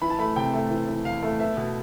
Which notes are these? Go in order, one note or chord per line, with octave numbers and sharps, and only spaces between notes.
E3 B5
A5
A3 B5
C3 G5
A3
E3
E3
E2 F5
A3
B3 E5
B2